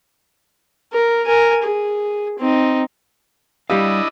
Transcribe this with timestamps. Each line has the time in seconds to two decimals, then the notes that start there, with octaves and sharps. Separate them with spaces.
0.93 A#4
1.26 A#4 G#5
1.63 G#4
2.39 C4 D#4
3.70 G3 D4 E4 G4 D#5 F5